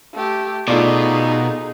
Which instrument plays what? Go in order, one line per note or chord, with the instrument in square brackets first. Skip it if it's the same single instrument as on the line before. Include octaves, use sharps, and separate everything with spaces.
[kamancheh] A3 G4
[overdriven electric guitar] B2 [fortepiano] A3 F4 D5 [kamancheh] D#4 G#4